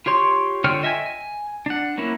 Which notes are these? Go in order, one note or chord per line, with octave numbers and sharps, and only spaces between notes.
F4 G4 C#5 C6 C#6
D3 F4 C#5 G5 F6
D#5 E5 G5 G#5
G#5
D4 F#5
F#3 A#3 C#4 E4